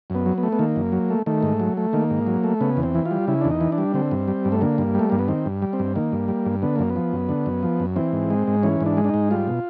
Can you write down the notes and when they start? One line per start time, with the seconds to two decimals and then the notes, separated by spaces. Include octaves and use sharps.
0.10 F#2 B3
0.26 F#3
0.38 B3
0.43 A3
0.52 B3
0.59 D#3 A#3
0.76 F#2
0.92 F#3
1.10 A3
1.26 D#3 A3
1.43 G#2
1.60 F#3
1.77 A3
1.93 D#3 A#3
2.10 G#2
2.27 F#3
2.43 A3
2.60 C#3 B3
2.77 E2
2.83 C4
2.95 E3
3.06 F4
3.11 G3
3.27 C#3 E4
3.41 E2 D4
3.50 D#4
3.61 E3
3.72 D4
3.78 G3
3.94 D3 C4
4.11 G2
4.28 G3
4.45 G2
4.52 A3
4.61 D3 A#3
4.78 G2
4.95 G3 A3
5.10 G2 A#3
5.19 B3
5.28 D#3 C4
5.46 G2
5.62 G3
5.73 C4
5.79 G2
5.96 D#3 A#3
6.12 G2
6.28 G3
6.46 G2
6.62 D3 B3
6.76 F#2 A#3
6.90 B3
6.96 F3
7.13 F#2
7.29 D3
7.46 F#2
7.63 F3
7.80 F#2
7.96 E3 C4
8.13 G#2
8.30 G#3
8.47 G#2
8.63 E3 C#4
8.81 G#2
8.86 D4
8.97 G#3
9.04 D4
9.09 D#4
9.14 G#2
9.31 G3 F4
9.48 B2